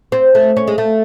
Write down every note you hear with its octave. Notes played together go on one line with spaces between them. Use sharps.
C4
A3
C#4
G#3
A3